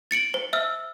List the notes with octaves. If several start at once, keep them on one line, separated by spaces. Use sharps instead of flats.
A6 C#7 D7 F#7
C5
E5 E6 F6